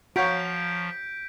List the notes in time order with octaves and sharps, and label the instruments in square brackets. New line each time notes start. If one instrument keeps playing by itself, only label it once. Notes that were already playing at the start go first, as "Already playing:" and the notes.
[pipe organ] F3 [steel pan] F#4 [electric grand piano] C#5 F5 A#5 [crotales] G6 B6 D7